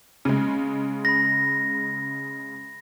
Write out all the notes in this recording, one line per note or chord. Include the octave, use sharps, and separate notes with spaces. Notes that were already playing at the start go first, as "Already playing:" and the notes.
C#3 G#3
B5 A#6